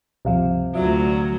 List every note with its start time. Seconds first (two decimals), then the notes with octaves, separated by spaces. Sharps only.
0.25 C#2 G2 C3 F3 F5
0.75 D2 F#3 F4 D5 E5